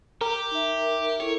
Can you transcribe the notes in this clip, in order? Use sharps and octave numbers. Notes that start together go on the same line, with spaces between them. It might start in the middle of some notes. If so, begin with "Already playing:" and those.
G4 A#4
D#4 E5
E4 A4 C#5